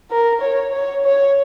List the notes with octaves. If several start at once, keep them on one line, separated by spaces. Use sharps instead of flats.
A#4
C#5
C#5
C#5